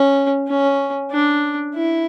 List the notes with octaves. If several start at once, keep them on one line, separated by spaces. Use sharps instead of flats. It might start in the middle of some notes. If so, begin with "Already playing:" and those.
Already playing: C#4
C#4
D4
E4